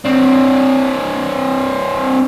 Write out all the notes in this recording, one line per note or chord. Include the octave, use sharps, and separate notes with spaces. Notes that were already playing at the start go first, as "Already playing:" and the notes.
C4 D4